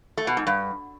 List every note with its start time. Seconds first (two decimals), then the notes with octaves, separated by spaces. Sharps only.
0.17 A3
0.27 B2
0.37 G#2
0.47 G2